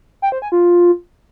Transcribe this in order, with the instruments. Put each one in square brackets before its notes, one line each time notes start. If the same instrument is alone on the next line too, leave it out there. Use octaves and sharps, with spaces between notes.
[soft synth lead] G5
C5
G#5
F4